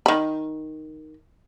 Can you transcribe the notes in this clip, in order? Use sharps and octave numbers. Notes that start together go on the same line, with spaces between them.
D#3 B5